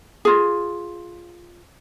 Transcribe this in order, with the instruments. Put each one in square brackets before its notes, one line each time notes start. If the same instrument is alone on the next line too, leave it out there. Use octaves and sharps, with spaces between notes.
[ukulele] F4 G#4